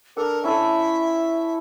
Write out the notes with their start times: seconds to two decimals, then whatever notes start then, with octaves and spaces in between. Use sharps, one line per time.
0.17 D4 A4 A#4
0.44 C#4 E4 A4 E5